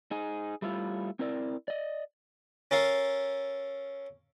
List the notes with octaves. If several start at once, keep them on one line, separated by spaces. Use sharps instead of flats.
D#4 G#4
G3 A3 E4 F4
C4 E4 A#4 D5
D5 D#5
C#4 A4 A#4 F5